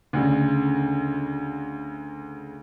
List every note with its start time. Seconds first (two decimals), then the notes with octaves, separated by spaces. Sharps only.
0.13 D2 C#3